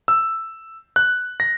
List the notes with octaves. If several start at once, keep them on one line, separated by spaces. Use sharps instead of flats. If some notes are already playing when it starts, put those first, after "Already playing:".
E6
F#6
A#6